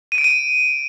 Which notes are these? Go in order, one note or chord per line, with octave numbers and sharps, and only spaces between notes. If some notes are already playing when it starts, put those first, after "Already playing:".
D#7
D7
D#7